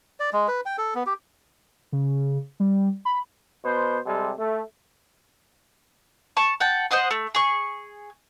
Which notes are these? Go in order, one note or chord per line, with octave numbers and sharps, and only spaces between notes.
D5
G#3
B4
G5
A4
B3
G4
C#3
G3
B5
B2 B3 C5
C3 G3 G#3 A4
A3
A5 C#6
F#5 G5 A5
C5 D#5 F#5 C6
A3
G#4 C#6